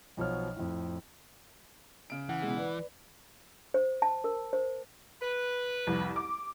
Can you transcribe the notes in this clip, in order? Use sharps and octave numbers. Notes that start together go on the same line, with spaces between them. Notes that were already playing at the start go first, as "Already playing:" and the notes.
B1 B2 F3 C#5 F6
F2 A2
C#3 D7
E3 F#5
B2 G#3
B4 D5
C5
A5
A#4
C5
B4
C2 F2
D6